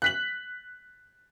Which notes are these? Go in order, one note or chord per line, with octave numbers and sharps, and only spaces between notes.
F#6 B6 F#7